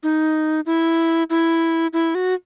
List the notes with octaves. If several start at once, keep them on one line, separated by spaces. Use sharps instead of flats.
D#4
E4
E4
E4
F#4